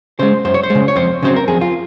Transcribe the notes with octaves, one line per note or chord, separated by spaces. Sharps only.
C#3 G#3 C5
F#2 C5
C#5
C5
G#3
C#3
C#5
F2 C5
C#3 F#3 C4 C5
A#4
F2 G#4
F4